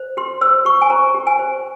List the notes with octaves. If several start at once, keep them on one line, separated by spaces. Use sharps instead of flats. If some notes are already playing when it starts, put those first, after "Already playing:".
Already playing: C5
G4 C6
C5 E6
G4 C#6
G#5
C5 A#5
G4
G#5
C5